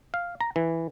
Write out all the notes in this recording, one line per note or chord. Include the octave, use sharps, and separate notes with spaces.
F5
A#5
E3